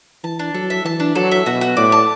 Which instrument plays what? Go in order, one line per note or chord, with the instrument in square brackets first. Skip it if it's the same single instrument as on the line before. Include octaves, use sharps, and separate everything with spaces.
[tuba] E3 [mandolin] A5
[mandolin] D4
[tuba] F#3 [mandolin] A4
[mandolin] E5
[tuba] E3 [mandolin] A5
[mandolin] D4
[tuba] F#3 [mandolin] A4
[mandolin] E5
[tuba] B2 [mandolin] F#4
[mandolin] F#4
[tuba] A2 [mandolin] D5
[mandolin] A5